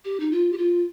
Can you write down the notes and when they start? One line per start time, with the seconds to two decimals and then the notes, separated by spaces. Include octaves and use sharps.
0.05 G4
0.20 D#4
0.32 F4
0.53 G4
0.58 F4